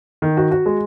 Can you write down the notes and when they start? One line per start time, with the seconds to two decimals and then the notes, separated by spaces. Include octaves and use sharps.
0.22 D#3
0.37 F#4
0.51 F#4
0.66 G#3